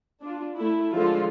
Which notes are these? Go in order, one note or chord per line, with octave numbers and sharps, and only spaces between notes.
D4 F4
A3 E4
D3 F3 G#3 F4 A4